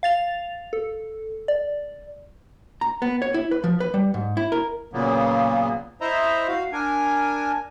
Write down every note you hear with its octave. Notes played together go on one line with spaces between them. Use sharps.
F5 A6 F7
A4
D5
A#5
B3
C#5
E4
B4
F3
B4
G3
G#2
E4
A#4
A#2 C#3 F#3 A#3 B3
E4 C5 D#5 E5 A#5
F#4 F5
D4 A#4 G#5